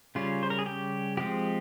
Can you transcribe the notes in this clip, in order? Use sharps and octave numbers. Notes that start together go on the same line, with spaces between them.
C#3 G3 C#4 F4
C5
A#4
G#4
G4
F3 G#3 C4 G4